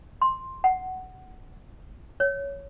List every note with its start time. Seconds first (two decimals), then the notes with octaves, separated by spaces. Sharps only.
0.22 C6
0.64 F#5
2.20 C#5